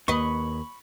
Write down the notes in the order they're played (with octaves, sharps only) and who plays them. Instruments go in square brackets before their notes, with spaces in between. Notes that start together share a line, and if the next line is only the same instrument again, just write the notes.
[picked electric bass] D#2 [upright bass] A#3 [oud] B4 D#5 [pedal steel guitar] B5 C#6